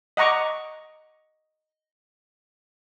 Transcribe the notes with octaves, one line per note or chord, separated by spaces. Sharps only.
D#5 F#5 A#5 C#6 D6